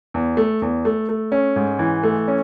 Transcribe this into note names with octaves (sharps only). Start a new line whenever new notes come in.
E2
A3
E2
A3
A3
C#4
G#2
E3
A3
C#4